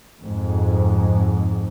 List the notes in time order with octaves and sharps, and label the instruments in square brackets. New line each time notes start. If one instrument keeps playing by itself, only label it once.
[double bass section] F2 G#2